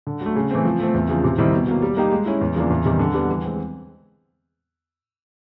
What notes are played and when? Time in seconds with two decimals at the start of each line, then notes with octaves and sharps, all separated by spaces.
0.07 D3
0.21 F#3 A3
0.36 C#3
0.51 E3 A3 C4
0.65 F3
0.80 A3 C4
0.94 E2
1.09 C#3 F3
1.24 C3
1.38 D#3 G3 C4 E4
1.53 B2
1.68 F#3 A#3
1.82 G3
1.97 A#3 D#4 G4
2.12 G#3
2.26 C#4 E4
2.41 E2
2.55 C#3 F3 A#3 D4
2.70 E2
2.85 C3 D#3 G3
2.99 D3
3.14 G3 B3
3.29 E3
3.43 G#3 C4